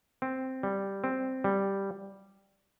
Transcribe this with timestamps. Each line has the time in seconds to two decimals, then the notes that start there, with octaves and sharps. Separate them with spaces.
0.22 C4
0.63 G3
1.04 C4
1.44 G3